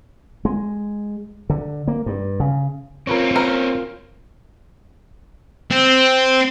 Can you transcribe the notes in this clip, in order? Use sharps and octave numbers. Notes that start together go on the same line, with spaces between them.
G#3
D3
A#3
G2
C#3
C4 C#4 F4 A#4 B4 C#5
A#4 B4
C4